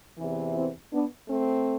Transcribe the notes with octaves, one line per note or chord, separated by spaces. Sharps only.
E2 C3 E3
C4 E4
B3 D4
A3 C4